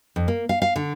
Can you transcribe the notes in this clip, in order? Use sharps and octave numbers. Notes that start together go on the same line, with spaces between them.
F2
A#3
F5
F5
D3